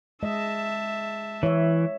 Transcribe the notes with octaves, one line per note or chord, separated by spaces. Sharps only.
G#3 D#5 E5 A5
E3 C#5 E5